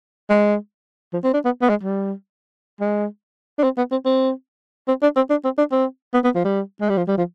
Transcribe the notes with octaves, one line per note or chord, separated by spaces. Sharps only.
G#3
F3
C4
D4
B3
B3
G#3
G3
G#3
D4
C4
B3
C4
C4
C4
D4
C4
D4
C4
D4
C4
B3
B3
F3
G3
G#3
G3
F3
G3
F3